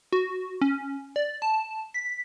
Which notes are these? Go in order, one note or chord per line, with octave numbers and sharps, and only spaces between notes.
F#4
C#4
D5
A5
B6